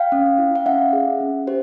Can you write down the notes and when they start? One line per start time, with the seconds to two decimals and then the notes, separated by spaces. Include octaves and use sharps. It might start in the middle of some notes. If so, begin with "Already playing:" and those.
Already playing: F5 G5
0.12 C#4
0.39 E4
0.56 F5
0.66 C#4 E5 F#5
0.93 G#4
1.21 C#4
1.47 G4 C5